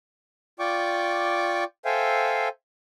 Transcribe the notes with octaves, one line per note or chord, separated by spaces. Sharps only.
F4 D5 G5 C#6 D6
A4 C5 E5 F5 G5 G#5